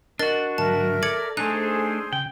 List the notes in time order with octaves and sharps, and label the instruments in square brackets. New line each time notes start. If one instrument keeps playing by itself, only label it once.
[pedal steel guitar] D4 F#4 [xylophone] A#4 D#5 A6
[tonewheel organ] G#2 D3 F#3 [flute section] A#4 E5 [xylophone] A5
[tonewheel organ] A4 [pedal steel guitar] D5 [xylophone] G#6 C#7
[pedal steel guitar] A3 D4 D#4 [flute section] G#4 C5 [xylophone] F#6
[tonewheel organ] C#3 [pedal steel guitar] G5